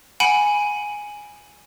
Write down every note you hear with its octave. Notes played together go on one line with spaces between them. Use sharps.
F#5 G#5 B5 C#7 D7